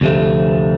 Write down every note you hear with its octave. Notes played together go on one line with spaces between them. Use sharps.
D2 C3 F3 A3